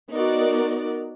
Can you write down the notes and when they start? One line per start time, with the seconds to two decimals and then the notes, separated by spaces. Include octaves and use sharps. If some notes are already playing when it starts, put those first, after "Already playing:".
0.11 B3 D#4 F#4 A#4 D5